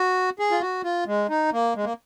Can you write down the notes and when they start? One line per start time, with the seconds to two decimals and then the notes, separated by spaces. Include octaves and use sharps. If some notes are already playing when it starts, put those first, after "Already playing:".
Already playing: F#4
0.39 G#4
0.51 F4
0.61 F#4
0.84 F4
1.06 G#3
1.30 D#4
1.53 A#3
1.76 G#3
1.84 A#3